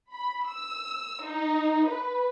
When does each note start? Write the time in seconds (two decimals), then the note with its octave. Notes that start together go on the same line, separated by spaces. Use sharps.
0.12 B5
0.47 E6
1.23 D#4
1.88 B4